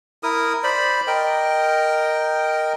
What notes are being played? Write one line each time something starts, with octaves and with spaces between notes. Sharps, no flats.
E4 A#4 D#6
C5 D5 B5
A#4 D#5 G5